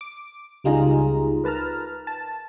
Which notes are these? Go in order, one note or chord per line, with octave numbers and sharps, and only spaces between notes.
D6
C#2 G3 D#4 F4 G#4 A#5
A#4 B4 A5 A#5 F6
A5